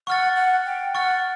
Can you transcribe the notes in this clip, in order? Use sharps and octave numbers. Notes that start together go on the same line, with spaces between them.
F#5 C#6 F6 A6
F#5
G5
F#5 C#6 F6 A6